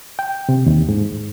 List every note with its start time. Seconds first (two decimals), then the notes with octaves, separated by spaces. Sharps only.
0.19 G5
0.49 C3
0.66 D#2
0.89 G#2